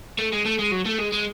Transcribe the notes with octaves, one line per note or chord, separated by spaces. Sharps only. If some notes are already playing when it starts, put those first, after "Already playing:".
A3
G#3
A3
G#3
F#3
A3
G#3
G#3